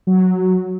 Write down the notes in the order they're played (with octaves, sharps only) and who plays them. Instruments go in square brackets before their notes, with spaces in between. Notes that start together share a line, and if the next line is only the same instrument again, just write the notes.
[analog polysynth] F#3